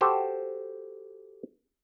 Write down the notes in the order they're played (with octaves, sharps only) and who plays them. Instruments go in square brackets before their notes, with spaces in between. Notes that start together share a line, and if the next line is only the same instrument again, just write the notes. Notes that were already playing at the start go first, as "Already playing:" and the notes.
[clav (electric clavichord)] F#4 G4 A4 C5